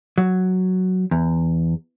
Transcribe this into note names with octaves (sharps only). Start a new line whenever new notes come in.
F#3
E2